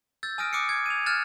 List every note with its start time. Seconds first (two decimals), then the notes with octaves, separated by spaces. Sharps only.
0.23 E6 G6 A6
0.38 G#5 D#6 F6 A#6 D7 D#7
0.53 D6 D#6 F#6 C7 C#7
0.69 G#6
0.86 D#7 F7
1.06 F6 F#6 A6 E7